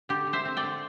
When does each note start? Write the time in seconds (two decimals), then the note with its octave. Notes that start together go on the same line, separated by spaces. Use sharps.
0.09 D3 G4
0.27 D3
0.33 C5 E5
0.45 C4
0.57 D5 G5
0.63 D3